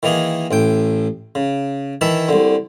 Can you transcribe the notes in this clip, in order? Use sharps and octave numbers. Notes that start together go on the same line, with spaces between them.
D#3 E3 A#3 D#4 G#4
A1 A2 G5
C#3
D#3 E3 E4 E5 A5
C2 D3